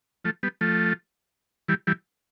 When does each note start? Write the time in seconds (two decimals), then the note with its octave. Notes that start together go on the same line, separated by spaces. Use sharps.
0.25 F3 A3
0.43 G3 B3
0.61 F3 A3
1.68 E3 G3
1.87 E3 G3